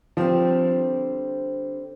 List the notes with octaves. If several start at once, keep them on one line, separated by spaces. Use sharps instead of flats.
D3 F3 G3 C4